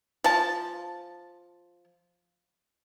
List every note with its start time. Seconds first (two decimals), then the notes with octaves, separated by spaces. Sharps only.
0.24 F3 A5